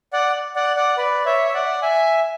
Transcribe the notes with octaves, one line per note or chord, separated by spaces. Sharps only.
D5 F#5
D5 F#5
D5 F#5
B4 D5
C#5 E5
E5
D5 F#5
E5 G#5